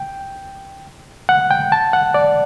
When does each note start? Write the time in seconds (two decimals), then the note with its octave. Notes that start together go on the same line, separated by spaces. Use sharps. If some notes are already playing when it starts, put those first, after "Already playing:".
Already playing: G5
1.29 F#5
1.51 G5
1.72 A5
1.93 F#5
2.14 D5